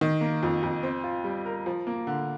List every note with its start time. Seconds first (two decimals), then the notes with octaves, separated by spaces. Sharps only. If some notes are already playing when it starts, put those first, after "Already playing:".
0.01 D#3
0.21 A#3
0.43 F2
0.63 F2
0.83 C4
1.04 F4
1.24 G3
1.46 A#4
1.66 F3
1.87 A#3
2.07 D3